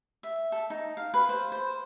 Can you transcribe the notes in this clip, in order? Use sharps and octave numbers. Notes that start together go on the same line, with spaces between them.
E5
A4
D#4
F5
B4
C5
C5